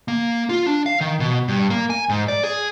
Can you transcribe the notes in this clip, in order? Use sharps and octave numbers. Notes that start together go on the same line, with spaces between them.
A#3
F4
D4
F5
D#3
B2
G2
A#3
G#5
G#2
D5
G#4